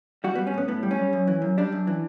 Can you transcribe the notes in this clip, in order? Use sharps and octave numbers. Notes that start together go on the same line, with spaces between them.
G3 F#4
G3 B3
C#4
A2 B3
A2 B3
G3
C#4
G3
F#2
E3
F#2
G3 D4
F#2
E3